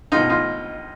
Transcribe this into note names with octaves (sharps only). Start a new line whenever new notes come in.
C#2 B2 D#4 F4
D#4 F4